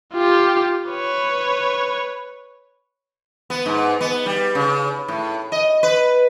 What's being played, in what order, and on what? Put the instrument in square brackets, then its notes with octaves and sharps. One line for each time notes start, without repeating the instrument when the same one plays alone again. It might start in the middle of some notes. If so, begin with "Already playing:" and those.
[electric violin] F4 G4
B4 C#5
[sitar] B3
G#2
B3
G3
C#3
A2
D#5
B4